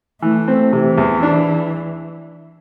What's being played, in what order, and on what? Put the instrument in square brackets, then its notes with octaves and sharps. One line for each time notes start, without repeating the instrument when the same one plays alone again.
[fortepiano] E3 [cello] A3
[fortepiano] C4
[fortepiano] C3 [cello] E3
[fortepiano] E2
D4